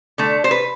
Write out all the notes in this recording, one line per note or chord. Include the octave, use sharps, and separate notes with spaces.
D3 A3
C5
B4